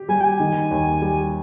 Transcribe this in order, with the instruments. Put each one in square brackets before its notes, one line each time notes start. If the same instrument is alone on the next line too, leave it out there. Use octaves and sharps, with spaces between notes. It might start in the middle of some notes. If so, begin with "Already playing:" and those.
Already playing: [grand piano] G4
[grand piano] G3 [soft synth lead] G#5
[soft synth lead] G5
G#5
[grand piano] D#3
D#2
G3